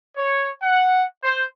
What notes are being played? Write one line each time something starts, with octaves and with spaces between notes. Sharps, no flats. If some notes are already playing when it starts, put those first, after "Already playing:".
C#5
F#5
C5